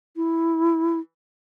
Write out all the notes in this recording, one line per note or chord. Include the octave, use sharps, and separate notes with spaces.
E4